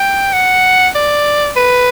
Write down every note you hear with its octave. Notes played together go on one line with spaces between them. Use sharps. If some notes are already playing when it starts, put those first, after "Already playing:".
Already playing: G5
F#5
D5
B4